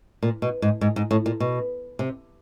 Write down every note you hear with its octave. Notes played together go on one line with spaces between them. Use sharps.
A#2
B2
G#2
G#2
G#2
A2
A#2
B2
C3